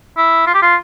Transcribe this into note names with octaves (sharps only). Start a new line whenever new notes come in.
E4
F4
G4
F4